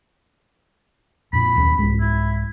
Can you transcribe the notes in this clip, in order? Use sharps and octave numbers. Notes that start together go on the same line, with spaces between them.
F2 A#2 B5
D1 D#2 C#4
C2 G#2 G#3
E4